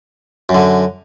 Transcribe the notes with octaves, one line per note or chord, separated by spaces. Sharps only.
F#2
D3